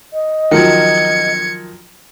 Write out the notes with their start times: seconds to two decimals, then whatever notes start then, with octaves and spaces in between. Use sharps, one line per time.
0.13 D#5
0.51 D#3 F3 F#3 G#6 C#7